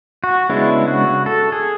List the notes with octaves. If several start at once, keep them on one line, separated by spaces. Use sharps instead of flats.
F#4
C#3 G#3 B3 D4 E4
F#4
A4
G#4